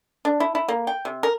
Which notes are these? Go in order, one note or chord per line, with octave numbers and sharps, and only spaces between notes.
D4
E4
E4
A#3
G5
C3
A#4